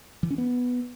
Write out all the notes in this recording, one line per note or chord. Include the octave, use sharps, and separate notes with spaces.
E3
C#4
B3